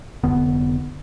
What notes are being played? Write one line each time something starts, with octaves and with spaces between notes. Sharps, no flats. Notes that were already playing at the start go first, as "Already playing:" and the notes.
F1 D3 B3